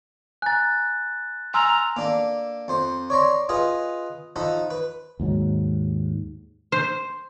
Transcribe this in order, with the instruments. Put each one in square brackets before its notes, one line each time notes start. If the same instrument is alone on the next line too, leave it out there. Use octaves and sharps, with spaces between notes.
[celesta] G#5 A#5 [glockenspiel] F#6 A6
[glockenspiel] G#5 [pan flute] A#5 [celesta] C6 E6 F6
[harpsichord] A#3 D4 A4
F2 C5 C6
C#5 D5 A#5 C6
F4 G#4 B4 D#5 F#5
F3 D#4 A4 F#5 B5
B4
[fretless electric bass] D#2 G#2 F#3
[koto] C5